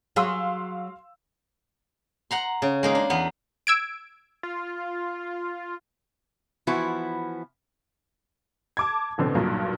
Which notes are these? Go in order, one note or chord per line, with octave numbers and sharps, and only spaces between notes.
F#3 G#4 F5 C6 E6
F#5 A#5 C6
C#3
G#3 A#3 D#4
D4
E2 B3
E6 G#6 D7
F4
E3 F3 B3 E4 F#4
A5 D6 G#6
A1 B2 D3 C4
B1 G2 A#2 F#3